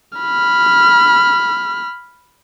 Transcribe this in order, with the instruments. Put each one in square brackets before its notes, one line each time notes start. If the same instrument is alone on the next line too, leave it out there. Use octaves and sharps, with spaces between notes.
[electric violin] B5 F6